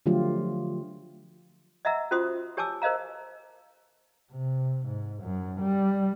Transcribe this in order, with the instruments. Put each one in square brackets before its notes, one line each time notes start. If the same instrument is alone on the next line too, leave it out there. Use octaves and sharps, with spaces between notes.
[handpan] D3 F3 F#3 A3 F4 G4
[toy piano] D#5 E5 F#5 A#5 E6
C#4 F4 F#4 C5 C6 D#6
G4 C#5 G#5 A5 D6 E6
A#4 C5 D#5 F5 A#5
[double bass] C3
G#2
F#2
G3